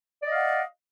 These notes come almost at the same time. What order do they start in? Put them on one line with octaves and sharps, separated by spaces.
D5 D#5 F5 F#5